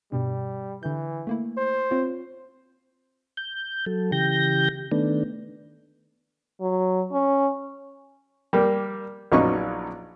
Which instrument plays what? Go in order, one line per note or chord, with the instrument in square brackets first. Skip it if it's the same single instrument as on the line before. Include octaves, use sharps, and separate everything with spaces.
[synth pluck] G2 B2 [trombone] G3
[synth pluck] D3 G6 [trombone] E3
[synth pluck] A3 A#3 E4
[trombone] C5
[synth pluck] C4 F4 C#5
[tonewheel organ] G6
F#3 A4
C#3 E3 G4 G6 A#6
D#3 A3 B3 D4
[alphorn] F#3
C#4
[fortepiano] G3 A#3
A#1 F#3 B3 C#4 D#4 C#6